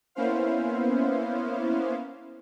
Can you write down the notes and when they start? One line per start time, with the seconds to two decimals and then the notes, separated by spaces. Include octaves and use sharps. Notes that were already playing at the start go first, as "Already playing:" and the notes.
0.15 A#3 B3 C#4 E4 C5 F5